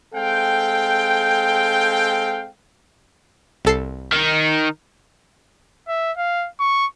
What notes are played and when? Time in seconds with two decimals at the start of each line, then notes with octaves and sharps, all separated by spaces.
0.14 G#3 C4 A4 F5 G5
3.65 C2 A4 C7
4.12 D#3 D#4
5.88 E5
6.18 F5
6.60 C#6